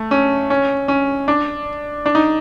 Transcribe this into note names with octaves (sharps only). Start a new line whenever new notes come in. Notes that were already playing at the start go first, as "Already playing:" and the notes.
Already playing: A3
C#4
C#4
C#4
D4
D4
D#4